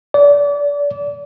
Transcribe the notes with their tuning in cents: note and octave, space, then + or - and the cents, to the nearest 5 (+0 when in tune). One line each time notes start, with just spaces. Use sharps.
D5 -30